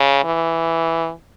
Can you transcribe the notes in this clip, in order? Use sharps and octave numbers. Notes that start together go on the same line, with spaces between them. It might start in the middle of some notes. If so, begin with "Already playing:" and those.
Already playing: C#3
E3